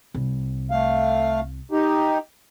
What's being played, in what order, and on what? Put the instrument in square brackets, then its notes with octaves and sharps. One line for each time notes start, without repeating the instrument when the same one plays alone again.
[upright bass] C2
[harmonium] A3 F5
D#4 G4